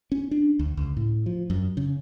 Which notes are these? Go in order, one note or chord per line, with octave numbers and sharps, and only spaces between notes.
C#4
D4
D2
C#2
A2
F3
F#2
C#3